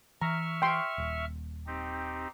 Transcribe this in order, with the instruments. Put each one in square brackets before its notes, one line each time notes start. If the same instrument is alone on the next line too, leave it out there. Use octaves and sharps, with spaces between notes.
[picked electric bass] E3 [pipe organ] E5 C#6 F6 [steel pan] A#5
[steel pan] G5 C6
[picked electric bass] D#1
[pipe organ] C4 D#4 G4